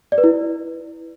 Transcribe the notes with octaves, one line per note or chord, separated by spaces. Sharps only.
D5
B4
E4